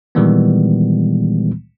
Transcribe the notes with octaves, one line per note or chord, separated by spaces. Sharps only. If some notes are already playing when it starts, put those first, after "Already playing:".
A#2 D#3 E3 G3 G#3 B3